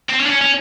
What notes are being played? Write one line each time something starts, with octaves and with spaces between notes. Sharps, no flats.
C4
C#4
D4
C#4
C#4